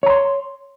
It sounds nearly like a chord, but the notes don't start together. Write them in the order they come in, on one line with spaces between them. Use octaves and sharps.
C#5 A#5 C6